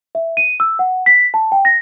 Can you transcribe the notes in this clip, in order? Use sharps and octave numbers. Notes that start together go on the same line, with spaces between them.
E5
D#7
E6
F#5
B6
A5
G5
A#6